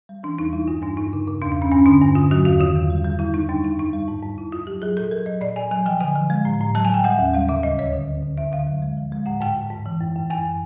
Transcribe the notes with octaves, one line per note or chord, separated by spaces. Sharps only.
G3
E3 D4
E2 D#4
G3 E4
G2 F4
G2 D4
G2 D#4
C#3
C#3
E2 D4
D4
E2 C#4
G2 C#4
D3 D4
G2
D3 F4
F#3 F#4
E2 F#4
D#3 F4
E2
G3
G3
G3 E4
G3 D#4
F#2 D4
G3 D#4
G3 D#4
G3
G#2
G#2
G#2 E4
G#2 F4
F#3 G4
F#3 G#4
A#2 A4
F#3 A#4
F#3 D#5
A#2 D5
A#2 G#5
F#3 G#5
F3 G5
D3 G#5
F3
G#3
A2
A2
F#3 A5
G#5
F#3 G5
G3 F#5
D#2 F#5
G3 F5
C#3 E5
D2 D#5
D2 C#5
D3
D2
D3
F#2 E5
D3 F5
F#3
G#3
F3
G#3
A2 F#5
G#2 G5
G#2
G#2
E3
F#2
F#2
F#2 G#5